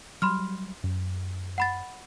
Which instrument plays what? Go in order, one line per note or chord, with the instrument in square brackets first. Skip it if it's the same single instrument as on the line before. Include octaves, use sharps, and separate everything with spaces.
[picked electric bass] F#3 G3 [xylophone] B5 C6 F6
[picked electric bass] F#2
[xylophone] F#5 B5 A6